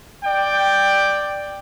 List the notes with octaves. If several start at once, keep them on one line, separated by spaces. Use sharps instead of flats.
D5 G5